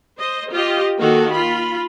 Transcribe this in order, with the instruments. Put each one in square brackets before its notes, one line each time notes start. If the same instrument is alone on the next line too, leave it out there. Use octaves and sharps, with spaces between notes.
[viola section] C5 D#5
F4 G4 D#5
D#3 A#3 F#4 A4
F4 B5